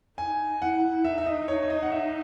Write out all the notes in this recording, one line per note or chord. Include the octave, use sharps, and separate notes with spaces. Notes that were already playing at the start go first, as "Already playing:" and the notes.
D#4 G#5
E4 F#5
D#4 E5
E5
D#5
C#5
C#5
D#5
F#5
E5